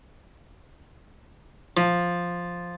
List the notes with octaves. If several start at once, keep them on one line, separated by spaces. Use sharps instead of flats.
F3